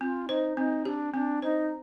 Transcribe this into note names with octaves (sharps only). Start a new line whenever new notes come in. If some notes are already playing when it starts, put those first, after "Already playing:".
C4 F4
D#4 C5
C4 D#4
D4 G4
C4 D4
D#4 C5